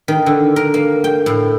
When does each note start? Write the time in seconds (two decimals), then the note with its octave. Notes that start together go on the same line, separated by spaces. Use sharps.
0.08 D#3
0.26 D3
0.56 A#4
0.74 A#3
1.04 G5
1.26 A2